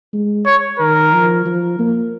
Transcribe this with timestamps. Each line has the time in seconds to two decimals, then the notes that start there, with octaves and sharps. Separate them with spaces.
0.13 G#3
0.46 C#5
0.80 D#3 A#4
1.13 F3
1.46 F3
1.79 A#3